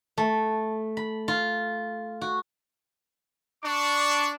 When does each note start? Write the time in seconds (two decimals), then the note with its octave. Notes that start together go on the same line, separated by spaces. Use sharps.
0.18 A3
0.97 B5
1.28 F4
2.21 F#4
3.64 D4 C#6